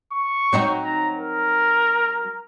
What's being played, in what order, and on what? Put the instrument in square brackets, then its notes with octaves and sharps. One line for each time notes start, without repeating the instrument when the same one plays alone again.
[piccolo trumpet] C#6
[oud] F#3 C4 D#4
[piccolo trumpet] A#5
A#4